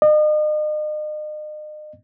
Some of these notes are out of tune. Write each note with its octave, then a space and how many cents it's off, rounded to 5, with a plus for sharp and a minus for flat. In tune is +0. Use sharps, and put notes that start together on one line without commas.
D#5 -40